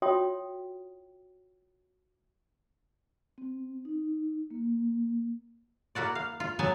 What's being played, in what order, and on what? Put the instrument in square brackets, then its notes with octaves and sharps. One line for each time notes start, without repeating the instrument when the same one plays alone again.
[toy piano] F4 F#4 C#5 E5 G5 D#6
[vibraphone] C4
D#4
A#3
[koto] A#3 E4 F#4 D5
F5
F4
F#3 B3 G#5 A5